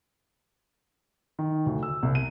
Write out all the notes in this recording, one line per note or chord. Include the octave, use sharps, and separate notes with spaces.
D#3
D2
E6
C2
D#7